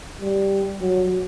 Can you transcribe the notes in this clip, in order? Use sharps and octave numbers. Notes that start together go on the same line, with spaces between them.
G3
F#3